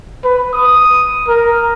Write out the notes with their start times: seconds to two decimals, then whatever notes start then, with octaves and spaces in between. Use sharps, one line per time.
0.24 B4
0.55 D#6
1.28 A#4